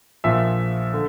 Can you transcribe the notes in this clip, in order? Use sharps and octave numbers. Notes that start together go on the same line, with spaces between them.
A#1 A#2 F3 E5
D3